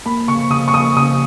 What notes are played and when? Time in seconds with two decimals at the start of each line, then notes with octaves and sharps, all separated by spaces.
0.06 A#3 B5
0.28 C#3 C#6
0.51 C#3 D#6
0.68 C#6
0.74 A#3 D#6
0.97 C#3 D#6